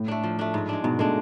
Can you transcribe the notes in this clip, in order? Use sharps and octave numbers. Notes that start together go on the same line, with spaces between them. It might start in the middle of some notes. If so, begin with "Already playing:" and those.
Already playing: A2
A3 D4
F3
A3 D4
G#2
G#3 D4
G#2 B2
G#3 A3 D4